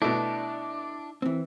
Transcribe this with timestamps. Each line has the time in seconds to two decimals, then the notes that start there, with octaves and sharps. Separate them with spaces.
0.02 B2 A3 D4 E4
1.22 E3 C4